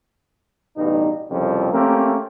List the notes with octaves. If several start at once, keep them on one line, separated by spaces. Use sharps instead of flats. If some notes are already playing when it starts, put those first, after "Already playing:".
A1 G2 B2 D#4
C2 F2 C#3 F3
A3 A#3 C4 C#4 G4 A#4